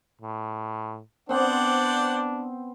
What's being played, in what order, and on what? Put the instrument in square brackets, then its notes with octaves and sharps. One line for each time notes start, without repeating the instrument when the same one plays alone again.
[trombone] A2
[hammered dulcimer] B3 C4 [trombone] D4 [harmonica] C5 D5 F#5